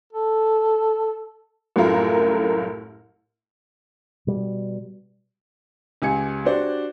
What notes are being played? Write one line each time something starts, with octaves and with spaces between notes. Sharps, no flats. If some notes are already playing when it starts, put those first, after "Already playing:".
A4
C2 F#2 A2 A3 F4 A#4
B2 G3
C#2 G4 G#5 G#6 C#7
D4 F#4 G4 C5 D5